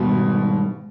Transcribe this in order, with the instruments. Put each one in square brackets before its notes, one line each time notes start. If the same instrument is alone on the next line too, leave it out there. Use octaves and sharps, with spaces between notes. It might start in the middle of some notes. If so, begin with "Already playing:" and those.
Already playing: [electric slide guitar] G#2 D#3 G3 [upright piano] B2